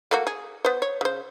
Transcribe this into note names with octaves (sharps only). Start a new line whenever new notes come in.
A3 A#3 F#4
G#4
B3 C5
C#5
C#3 C5